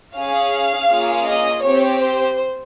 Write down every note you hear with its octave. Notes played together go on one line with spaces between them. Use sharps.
C#4 G#4 F5
A#3 C#4 F4 G#4
D#5
C4 G4 C#5
C5